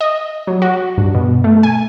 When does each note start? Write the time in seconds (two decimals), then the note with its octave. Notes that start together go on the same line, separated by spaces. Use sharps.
0.01 D#5
0.47 F#3
0.62 F#4
0.98 G2
1.14 B2
1.44 A3
1.63 G#5